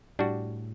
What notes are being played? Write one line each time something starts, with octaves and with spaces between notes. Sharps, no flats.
A2 G3 D4 F#4